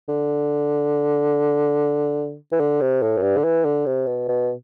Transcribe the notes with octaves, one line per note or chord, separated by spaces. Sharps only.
D3
E3
D3
C3
A2
F#2
G2
D3
E3
D3
C3
B2
B2